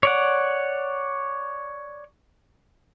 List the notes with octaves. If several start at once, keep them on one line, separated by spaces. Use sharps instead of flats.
C#5 D5 F#5